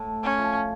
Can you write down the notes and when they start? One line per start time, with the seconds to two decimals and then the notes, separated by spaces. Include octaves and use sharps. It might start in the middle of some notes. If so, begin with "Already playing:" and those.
Already playing: A2
0.23 C#4
0.38 F3